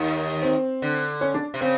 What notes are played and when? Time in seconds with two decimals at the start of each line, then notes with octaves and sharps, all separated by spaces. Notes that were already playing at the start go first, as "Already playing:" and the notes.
Already playing: D#2 D#3
0.42 C4
0.82 D3
1.21 C#4
1.34 D4
1.54 C3
1.61 C#3 C4